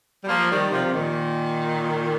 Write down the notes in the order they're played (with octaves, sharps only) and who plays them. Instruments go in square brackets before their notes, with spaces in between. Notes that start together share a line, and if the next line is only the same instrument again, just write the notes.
[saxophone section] G3
F3 A#3
D#3 G3
C3 F3
C3
A#2 D#3